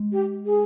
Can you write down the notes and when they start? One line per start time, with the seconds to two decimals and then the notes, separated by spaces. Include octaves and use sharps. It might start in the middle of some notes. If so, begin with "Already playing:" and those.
Already playing: G#3
0.13 G4
0.45 G#4